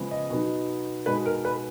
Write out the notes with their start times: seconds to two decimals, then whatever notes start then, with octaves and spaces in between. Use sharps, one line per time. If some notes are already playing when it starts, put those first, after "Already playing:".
Already playing: C#3 F3 G#3 B3
0.11 D#5
0.30 B2 F#3 B3 D#4
1.06 B2 G#3 D#4 B4
1.26 A#4
1.45 B4